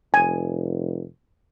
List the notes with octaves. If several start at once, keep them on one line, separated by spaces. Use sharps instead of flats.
F1 G#5